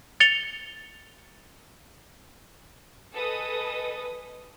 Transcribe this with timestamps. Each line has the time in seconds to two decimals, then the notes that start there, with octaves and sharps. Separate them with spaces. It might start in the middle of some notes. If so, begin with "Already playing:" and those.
0.20 A6 C#7 F7 G7
3.13 G#4 A4 B4 D#5 D#6